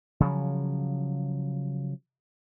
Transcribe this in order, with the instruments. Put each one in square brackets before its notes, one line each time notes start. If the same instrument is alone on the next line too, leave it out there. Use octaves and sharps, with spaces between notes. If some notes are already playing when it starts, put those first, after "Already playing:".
[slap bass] C#3 F3 F#3